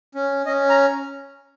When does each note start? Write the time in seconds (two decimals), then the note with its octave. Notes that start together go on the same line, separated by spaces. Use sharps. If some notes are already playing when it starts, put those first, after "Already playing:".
0.15 C#4
0.46 C#4 D#5
0.69 A#5